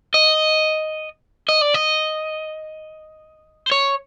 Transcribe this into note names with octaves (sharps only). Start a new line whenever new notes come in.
D#5
D#5
D5
D#5
C5
C#5